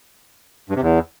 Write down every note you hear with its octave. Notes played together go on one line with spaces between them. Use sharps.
G2
C3
E2